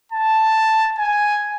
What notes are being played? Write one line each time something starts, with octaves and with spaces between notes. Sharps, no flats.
A5
G#5